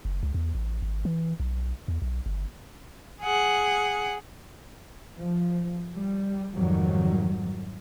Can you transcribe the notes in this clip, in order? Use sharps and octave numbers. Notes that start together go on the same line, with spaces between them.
F#1
C#2
E2
A1
G#1
E3
B1
E2
B1
G1
G#4 F#5
F3
G3
F2 G#2 D#3 F#3 G3